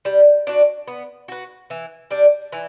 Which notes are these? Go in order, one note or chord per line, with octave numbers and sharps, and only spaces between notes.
G3
D4 F#4
B3
F#4 B4
E3
G3 D4
E3